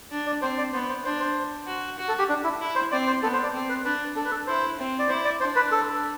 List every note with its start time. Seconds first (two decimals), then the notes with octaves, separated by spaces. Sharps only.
0.11 D4
0.27 D5
0.42 C4 C5
0.58 D5
0.73 B3 C5
0.89 C5
1.05 D4 C5
1.20 C5
1.67 F#4
1.98 F#4
2.08 A4
2.19 G4
2.29 D4
2.44 E4
2.60 E4
2.75 C5
2.92 C4 D5
3.07 C5
3.23 B3 A4
3.33 C5
3.43 D5
3.54 C4
3.69 B4
3.85 D4 B4
4.16 D4 A4
4.25 B4
4.31 A4
4.47 E4 C5
4.79 C4
4.99 D5
5.09 E4 C5
5.25 D5
5.40 D4 C5
5.56 B4
5.71 A4